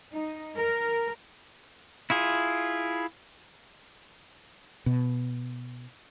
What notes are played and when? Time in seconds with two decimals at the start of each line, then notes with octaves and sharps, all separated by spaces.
0.12 D#4
0.56 A#4
2.10 E4 F4 G#4
4.86 B2